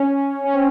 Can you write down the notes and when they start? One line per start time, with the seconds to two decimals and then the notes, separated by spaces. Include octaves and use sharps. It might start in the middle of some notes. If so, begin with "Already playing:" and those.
Already playing: C#4
0.44 C#4
0.54 C4